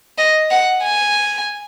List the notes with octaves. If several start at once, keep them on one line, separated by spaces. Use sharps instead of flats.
D#5
F#5
G#5